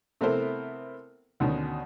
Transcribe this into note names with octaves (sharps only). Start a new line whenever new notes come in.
C3 A3 B3 E4 A#4 C5
D2 B2 D#3 C#4